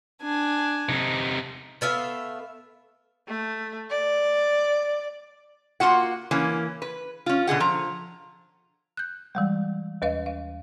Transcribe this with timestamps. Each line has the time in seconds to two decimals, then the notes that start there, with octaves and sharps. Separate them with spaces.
0.22 D4 G#5
0.89 C3 D#4
1.81 A3 B3 E5 F5
3.28 A3
3.90 D5
5.80 A#3 C4 F4 F#4 F#5
6.31 E3 A#3 C#4
6.82 B4
7.26 C#4 F4
7.47 B2 D3 G#4 F#5
7.60 F3 A#5
8.97 F#6 G6
9.35 E3 G3 G#3
10.02 D#2 B4 D#5 F5
10.26 F5